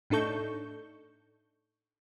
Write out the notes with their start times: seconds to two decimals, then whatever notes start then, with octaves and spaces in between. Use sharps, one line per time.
0.10 A2 D4 D#4 A4 C#6 G6